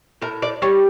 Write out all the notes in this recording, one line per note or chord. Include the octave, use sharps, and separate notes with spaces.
A2 A#4
D5
G3 C#5